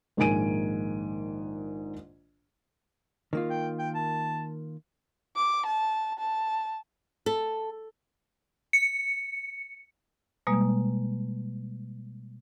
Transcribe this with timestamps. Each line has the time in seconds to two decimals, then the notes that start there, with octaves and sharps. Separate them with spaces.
0.17 A#1 G#2 D#3 G#5 D7 D#7
3.33 D#3 A#3 F4
3.50 G5
3.79 G5
3.95 A5
5.36 D6
5.66 A5
6.19 A5
7.26 A4
8.73 C#7
10.47 B2 G3 G#3 A#3